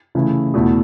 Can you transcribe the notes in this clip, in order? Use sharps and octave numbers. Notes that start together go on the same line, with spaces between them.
C#3 E3 A3 E4
E2 B2 A3 E4